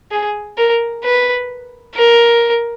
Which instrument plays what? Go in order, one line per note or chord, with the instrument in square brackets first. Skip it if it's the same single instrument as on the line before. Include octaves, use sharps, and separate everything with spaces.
[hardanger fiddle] G#4
A#4
B4
A#4